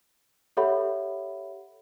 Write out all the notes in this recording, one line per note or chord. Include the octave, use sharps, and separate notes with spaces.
G4 A4 C#5 E5 F#5 B5